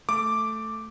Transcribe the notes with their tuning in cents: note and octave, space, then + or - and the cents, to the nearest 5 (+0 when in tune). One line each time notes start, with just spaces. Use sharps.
A3 +0 D6 +0